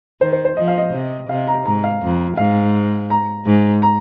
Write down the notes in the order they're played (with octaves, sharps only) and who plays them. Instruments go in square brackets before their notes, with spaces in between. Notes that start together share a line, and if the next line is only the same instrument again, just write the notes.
[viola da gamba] D#3 [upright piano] C5
[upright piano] C5
C5
[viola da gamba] F3 [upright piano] D#5
[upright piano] F5
D#5
[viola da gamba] C3
[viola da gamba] C3 [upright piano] F5
[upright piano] A#5
[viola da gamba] G#2 [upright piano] A#5
[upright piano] F5
[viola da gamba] F2
[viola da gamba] G#2 [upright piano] F5
[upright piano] A#5
[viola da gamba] G#2
[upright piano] A#5